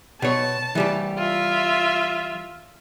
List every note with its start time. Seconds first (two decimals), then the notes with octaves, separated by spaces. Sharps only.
0.22 B2 C#5 A5
0.75 E3 G3 G4
1.18 F4 E5